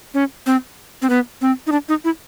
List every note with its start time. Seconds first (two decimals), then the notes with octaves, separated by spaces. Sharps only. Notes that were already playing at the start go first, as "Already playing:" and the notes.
0.14 C#4
0.46 C4
1.02 C4
1.10 B3
1.41 C4
1.67 D#4
1.72 D4
1.89 D#4
2.05 E4